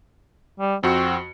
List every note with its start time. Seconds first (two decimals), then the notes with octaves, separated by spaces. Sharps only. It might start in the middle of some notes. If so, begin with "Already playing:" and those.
0.59 G3
0.83 F2 C4 F#4 C#7